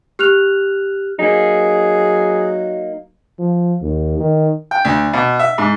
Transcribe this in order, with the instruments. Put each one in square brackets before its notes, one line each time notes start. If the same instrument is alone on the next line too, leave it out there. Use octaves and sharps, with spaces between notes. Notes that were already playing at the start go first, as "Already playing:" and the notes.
[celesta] G4 F6 F#6 F7
[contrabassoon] F#3 [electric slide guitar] A#3 D#4 [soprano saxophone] G#4
[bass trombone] F3
D#2
D#3
[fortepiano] G5
D2
B2
E5
G#2